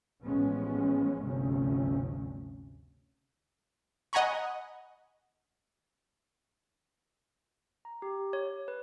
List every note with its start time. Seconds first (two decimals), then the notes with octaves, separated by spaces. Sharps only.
0.24 A1 F3 G#3 B3 C#4
1.22 G1 D2 C3 F3 C#4
4.13 D#5 F#5 G#5 A#5 B5 C#6
7.85 A#5
8.02 G4
8.33 C#5
8.68 B4